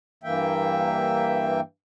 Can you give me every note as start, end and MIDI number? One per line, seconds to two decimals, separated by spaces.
0.24 1.60 43
0.24 1.60 52
0.24 1.60 58
0.24 1.60 76
0.24 1.60 79